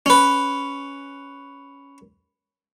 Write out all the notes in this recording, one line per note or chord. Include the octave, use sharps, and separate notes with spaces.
C#4 B4